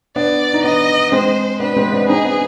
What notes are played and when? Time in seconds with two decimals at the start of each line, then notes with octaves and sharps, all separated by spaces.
0.16 B3 D4 D5
0.54 D#4
0.64 B3 D4 D#5
1.12 G#3 C4 C5
1.60 B3 D4 B4
1.76 G#3 C4
1.92 B3 D4
2.08 C4 D#4 G#4
2.24 B3 D4